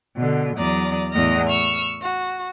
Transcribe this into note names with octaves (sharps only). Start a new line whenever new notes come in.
B2 D3
E2 F#3 D5 A#5 D#6
E2 A2 D#5 F6 A#6
C#6 E6 F6
F#4